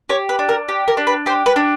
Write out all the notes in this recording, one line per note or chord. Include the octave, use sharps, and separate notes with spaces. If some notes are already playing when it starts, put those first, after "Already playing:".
G4 C#5
B4
D4
A#4
G4
A#4
D4
B4
G4 C5
B4
D4